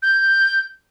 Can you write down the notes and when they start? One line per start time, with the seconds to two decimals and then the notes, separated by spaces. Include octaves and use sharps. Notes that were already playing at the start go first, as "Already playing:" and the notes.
0.02 G6